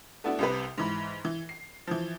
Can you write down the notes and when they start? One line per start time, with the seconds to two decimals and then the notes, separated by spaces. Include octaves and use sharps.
0.24 A3 B3 D4 E4 F#4
0.39 C2 C3 B4
0.78 G#2 E3 B5
1.25 E3
1.49 C7
1.87 E3 F3